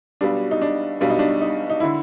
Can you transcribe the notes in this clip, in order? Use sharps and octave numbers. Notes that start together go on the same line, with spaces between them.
B1 B2 G3 D4
D#4
D4
B1 B2 G3 D4
D#4
D4
D#4
D#4
D3 E4